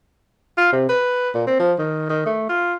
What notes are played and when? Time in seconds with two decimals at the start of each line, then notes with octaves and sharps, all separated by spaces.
0.57 F4
0.73 C3
0.89 B4
1.34 A#2
1.47 C4
1.59 F3
1.78 D#3
2.09 D#3
2.26 A3
2.49 F4